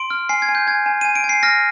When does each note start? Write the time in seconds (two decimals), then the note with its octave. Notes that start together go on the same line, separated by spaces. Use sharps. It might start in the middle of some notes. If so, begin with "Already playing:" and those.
Already playing: C6 D7
0.10 F6
0.29 G#5 C7
0.42 G#6
0.49 G#5
0.55 G6
0.67 G#5 G#6
0.86 G#5
1.01 G#5 D#7
1.15 D7
1.24 G#5
1.29 C7
1.43 F6 A#6